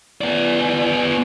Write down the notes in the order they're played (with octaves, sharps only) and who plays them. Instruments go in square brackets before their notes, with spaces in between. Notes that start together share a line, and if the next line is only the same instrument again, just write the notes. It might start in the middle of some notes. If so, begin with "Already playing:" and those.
[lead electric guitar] B3 D5